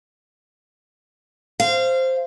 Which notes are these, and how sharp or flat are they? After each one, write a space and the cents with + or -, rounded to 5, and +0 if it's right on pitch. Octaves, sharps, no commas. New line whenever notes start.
C5 +0 F5 -25